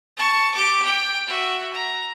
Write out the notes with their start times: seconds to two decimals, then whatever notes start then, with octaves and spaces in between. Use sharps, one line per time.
0.17 A5 C#6
0.54 G4 D6
0.84 G5
1.27 F#4 E5
1.73 A#5